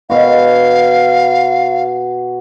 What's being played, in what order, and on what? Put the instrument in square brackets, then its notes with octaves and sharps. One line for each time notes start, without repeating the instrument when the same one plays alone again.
[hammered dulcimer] B2 F#4 [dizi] F5